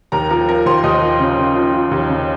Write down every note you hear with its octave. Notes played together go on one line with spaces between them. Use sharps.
D#2 A#4 A#5
F3 A#4 A#5
F3 A#4 A#5
D#2 C5 C6
D#2 D#5 D#6
F3
C#3
C#3
F3
F3
D#2
C#3